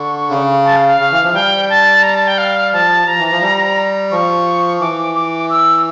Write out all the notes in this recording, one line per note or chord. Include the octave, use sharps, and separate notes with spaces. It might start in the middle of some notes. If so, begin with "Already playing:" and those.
Already playing: D3 C#6
C#3
A5
F5
F5
C#3
E3
F3
G3 G5
A5
A#5
A5
G5
F5
F3 A5
F3 A#5
E3
F3
G3
F3 C#6
E3 D6
D6
E6